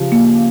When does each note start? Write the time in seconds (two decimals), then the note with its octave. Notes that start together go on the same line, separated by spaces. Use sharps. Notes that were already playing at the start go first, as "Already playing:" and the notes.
Already playing: C#3 F3 G4
0.12 A#3